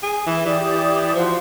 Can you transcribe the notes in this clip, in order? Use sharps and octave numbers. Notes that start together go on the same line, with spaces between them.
G#4
E3
E3 G4 D5 D#6
F3 F#4 C5 F5